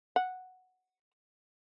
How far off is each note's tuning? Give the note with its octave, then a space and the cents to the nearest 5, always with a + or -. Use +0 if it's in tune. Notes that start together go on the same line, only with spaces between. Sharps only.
F#5 +0